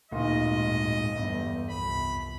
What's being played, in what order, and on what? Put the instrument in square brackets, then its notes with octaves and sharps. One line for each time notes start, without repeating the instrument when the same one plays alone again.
[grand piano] D1 A#2 D#3 [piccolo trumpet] D#5
[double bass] G#2 G#3
[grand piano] G1 [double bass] E2 G3
[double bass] C2 F2 [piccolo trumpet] B5